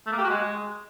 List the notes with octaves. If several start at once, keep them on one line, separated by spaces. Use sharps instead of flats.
A3
A#3
G4
F#4
G#3